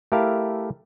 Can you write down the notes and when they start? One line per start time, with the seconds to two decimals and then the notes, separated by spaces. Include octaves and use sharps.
0.12 A3 E4 G4 A4 A#4 F5